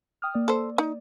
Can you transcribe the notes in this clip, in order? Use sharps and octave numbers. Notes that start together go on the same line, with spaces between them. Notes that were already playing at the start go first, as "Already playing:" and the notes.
G5 D#6 F6
A#3 D5
A4 C5
D#4